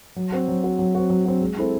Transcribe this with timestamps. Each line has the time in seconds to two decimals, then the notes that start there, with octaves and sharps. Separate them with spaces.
0.16 F#3
0.32 C4 F#4
0.48 F#3
0.63 C4 F#4
0.79 F#3
0.95 C4 F#4
1.10 F#3
1.26 C4 F#4
1.41 G#3
1.57 C4 E4 A4